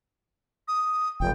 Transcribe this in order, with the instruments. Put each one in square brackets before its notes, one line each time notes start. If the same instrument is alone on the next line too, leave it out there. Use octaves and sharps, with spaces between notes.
[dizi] D#6
[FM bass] F1 [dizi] G5